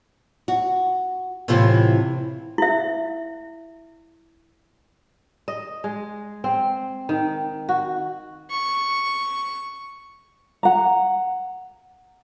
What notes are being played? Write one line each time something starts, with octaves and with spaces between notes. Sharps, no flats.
F#4
A2 C3 E3 C4 F4
E4 E5
D#5
G#3
C4
D#3
F#4
C#6
F#5 A#5